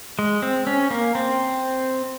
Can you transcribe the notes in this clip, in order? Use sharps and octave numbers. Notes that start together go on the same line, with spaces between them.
G#3
C4
C#4
A#3
C4